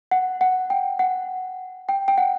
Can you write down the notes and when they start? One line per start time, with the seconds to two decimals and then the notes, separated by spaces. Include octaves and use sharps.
0.11 F#5
0.41 F#5
0.70 G5
0.99 F#5
1.89 G5
2.08 G5
2.18 F#5